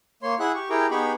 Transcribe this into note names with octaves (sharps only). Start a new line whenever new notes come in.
A#3 C#5 C6
E4 G#4 E5 F#5 F#6
G4 C#6
E4 G4 G#4 A#4 G5 A#5
B3 D#4 G4 G#4 B5 C#6